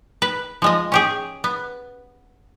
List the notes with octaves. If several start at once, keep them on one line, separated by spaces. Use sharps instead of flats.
B4
F3 G#3 D#5
C#4 G4 G#4
B3